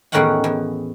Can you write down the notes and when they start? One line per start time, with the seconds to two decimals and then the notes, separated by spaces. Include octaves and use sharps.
0.12 E2 A2 D#3 C#4 F#5 G5
0.44 E2